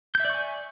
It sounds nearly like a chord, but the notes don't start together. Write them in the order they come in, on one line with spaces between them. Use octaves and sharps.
G6 E5 D5 C#6 G#5